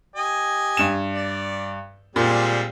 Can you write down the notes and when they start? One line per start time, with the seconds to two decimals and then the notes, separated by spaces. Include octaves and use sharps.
0.16 G4 D#5 G#5
0.77 G2 E7
1.14 D5
2.16 A#2 G3 G#3 C4